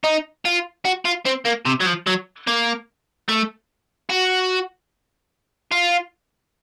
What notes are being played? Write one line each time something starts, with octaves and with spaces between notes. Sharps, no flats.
D#4
F4
F#4
F4
C4
A#3
C3
F#3
F3
F#3
A#3
A3
F#4
F4